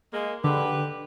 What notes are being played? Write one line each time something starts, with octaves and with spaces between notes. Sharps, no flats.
G#3 A#3
D3 G4 B4